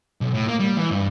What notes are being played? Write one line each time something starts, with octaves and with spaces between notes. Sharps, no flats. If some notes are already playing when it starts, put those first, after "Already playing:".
B1
A2
A#3
G3
E3
G2